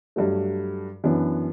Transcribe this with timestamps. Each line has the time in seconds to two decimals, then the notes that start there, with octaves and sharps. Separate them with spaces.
0.16 G2 F#3 A3
1.04 F#2 E3 B3 D4